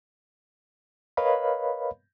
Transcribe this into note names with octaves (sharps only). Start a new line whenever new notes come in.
A#4 B4 C#5 D#5 F5 B5